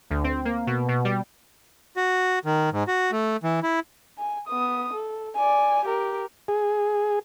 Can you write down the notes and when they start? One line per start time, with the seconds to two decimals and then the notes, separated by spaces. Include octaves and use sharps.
0.10 D2
0.24 C4
0.45 A#3
0.67 B2
0.88 B2
1.05 G3
1.97 F#4
2.45 D#3
2.72 G#2
2.88 F#4
3.12 A3
3.43 E3
3.63 E4
4.18 G#5
4.48 B3 D#6
4.93 A4
5.35 D5 G#5
5.85 G4 A#4
6.48 G#4